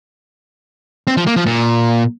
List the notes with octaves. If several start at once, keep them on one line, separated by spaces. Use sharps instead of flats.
C4
F3
A#3
F3
A#2